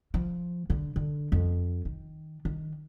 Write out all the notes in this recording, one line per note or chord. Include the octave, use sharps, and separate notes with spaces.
F3
D3
D3
F2
D#3
D#3